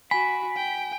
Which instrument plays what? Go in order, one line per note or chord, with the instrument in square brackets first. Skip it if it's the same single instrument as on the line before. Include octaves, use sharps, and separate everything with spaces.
[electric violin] F#4 [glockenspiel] G#5 [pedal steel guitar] B5
[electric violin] G5